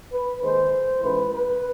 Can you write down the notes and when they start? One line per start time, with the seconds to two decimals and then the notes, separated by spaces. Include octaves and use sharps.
0.12 B4
0.42 D#2 D#3 G#3 C5
1.01 A1 G#2 E3 B4
1.32 B4